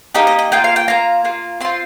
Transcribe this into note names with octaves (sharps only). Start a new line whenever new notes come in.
A#3 D#4 G4 D#5
D#5
D#5
A#3 F4 G5
F5
G5
A#3 F4 A#5
A#3 F4
C4 F4 C6